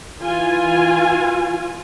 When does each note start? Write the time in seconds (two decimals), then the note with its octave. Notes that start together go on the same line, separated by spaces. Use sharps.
0.21 E3 F4 G#5